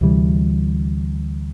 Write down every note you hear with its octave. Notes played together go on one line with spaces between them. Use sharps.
D2 C3 E3 G3